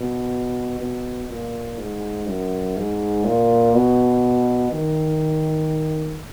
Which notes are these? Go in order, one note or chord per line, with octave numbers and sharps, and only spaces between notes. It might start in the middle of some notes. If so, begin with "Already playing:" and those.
Already playing: B2
B2
A#2
G#2
F#2
G#2
A#2
B2
D#3